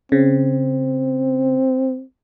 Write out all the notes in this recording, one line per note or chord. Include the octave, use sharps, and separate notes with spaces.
C#3 C4